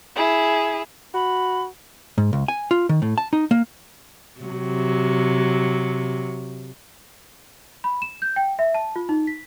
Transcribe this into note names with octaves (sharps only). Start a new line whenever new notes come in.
E4 G#4
F#4 B5
G#2
C#2
G#5
F4
D#3
A2
A5
D#4
A#3
C3 F#3
B5
E7
G6
G5
E5
A5
F4
D#4
B6